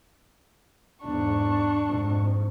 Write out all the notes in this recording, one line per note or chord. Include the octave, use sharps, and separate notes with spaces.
E2 G#2 D4 C#6
F2 G#2